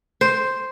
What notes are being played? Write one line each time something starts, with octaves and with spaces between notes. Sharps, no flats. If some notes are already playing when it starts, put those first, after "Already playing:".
C5